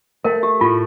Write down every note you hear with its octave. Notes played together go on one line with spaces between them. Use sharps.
A3 A#4
G4
A2 F4